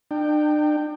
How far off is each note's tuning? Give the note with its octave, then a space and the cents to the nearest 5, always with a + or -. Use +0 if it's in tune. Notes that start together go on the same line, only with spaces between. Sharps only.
D4 +40 G5 +0